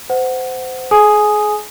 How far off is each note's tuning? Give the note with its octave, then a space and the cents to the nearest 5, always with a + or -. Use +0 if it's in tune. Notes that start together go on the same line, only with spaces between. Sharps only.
C5 -25 F#5 +0
G#4 +30 G#5 +10 D#6 +0